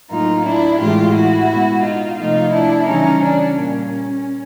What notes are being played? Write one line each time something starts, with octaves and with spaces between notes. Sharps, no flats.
A2 F#3 A#3 D#4 F4
D4 E4
A2 E3 G#3 F4 G4
E4 F#4
B2 G#3 B3
D#4 F4
C3 F3 A3 D#4 F4
D4 E4
C#3 E3 G3 C#4 D#4
D4
A#2 G3 A#3 C#4